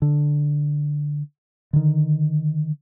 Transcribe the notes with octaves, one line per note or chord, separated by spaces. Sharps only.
D3
D3 D#3